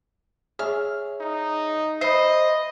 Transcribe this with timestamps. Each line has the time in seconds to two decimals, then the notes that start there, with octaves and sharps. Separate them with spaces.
0.59 G#4 C#5 E5 F6
1.21 D#4
2.01 C5 D#5 E5 B5